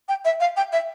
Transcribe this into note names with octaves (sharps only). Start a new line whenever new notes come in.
G5
E5
F5
G5
E5